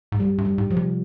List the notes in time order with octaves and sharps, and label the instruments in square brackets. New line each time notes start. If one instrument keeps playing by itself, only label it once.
[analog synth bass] G#2
[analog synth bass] G2 [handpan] G3
[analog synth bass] G2
[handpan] G3
[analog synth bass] G#2
[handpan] F3
[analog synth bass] C3